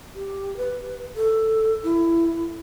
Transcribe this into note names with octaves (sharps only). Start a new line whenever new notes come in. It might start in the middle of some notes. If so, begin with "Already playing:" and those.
G4
B4
A4
E4